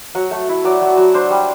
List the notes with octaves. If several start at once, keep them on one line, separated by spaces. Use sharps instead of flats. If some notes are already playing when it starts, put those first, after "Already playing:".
F#3 F#5
A3
E4
F#3 D5
F#3
F#3
D4 C5
G3